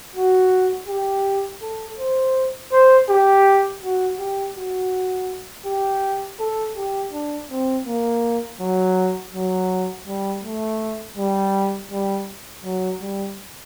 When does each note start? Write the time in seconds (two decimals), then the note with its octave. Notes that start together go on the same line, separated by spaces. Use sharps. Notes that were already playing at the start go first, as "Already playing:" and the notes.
0.16 F#4
0.88 G4
1.62 A4
1.98 C5
2.72 C5
3.09 G4
3.83 F#4
4.19 G4
4.56 F#4
5.66 G4
6.39 A4
6.77 G4
7.13 D4
7.51 C4
7.87 A#3
8.60 F#3
9.34 F#3
10.07 G3
10.44 A3
11.17 G3
11.91 G3
12.64 F#3
13.01 G3